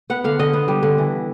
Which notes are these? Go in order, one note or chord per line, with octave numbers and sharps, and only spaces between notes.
B3 F#5
D3 F5
D3 D#5
B3
G3
D3
E3